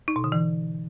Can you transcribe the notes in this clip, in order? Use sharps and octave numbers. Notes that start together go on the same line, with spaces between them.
D#4
B2
D3
E3